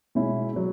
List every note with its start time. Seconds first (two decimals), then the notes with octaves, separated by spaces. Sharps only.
0.15 B2 G#3 C#4 E4
0.56 F#3